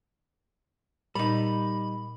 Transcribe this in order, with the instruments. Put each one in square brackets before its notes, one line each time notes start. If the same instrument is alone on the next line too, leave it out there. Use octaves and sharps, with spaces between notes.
[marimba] A#2 [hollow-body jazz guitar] G3 D#4 [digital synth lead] B5